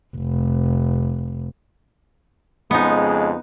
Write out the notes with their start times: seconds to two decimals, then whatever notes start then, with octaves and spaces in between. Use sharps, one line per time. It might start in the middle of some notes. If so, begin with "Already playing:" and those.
0.16 F1
2.71 F2 C#3 G#3 B3 D#4